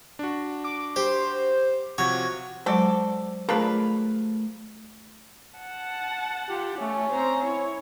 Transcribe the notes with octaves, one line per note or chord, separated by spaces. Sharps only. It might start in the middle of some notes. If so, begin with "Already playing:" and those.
D4 F#4
D6
G4 C5
C3 F3 F#4 C#5 G#6
F#3 G#3 F#4 A4 C5 D5
F3 A3 D4 G#4 A#4 B4
F#5 A5
F4 G4
A3 C#4
C4 C5 A#5
E4 C#5